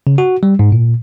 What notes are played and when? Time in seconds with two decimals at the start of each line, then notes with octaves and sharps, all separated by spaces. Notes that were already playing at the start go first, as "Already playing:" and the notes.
0.07 C#3
0.18 F#4
0.43 G3
0.59 G#2
0.72 A#2